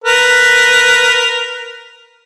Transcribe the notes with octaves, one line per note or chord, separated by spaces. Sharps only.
A#4 B4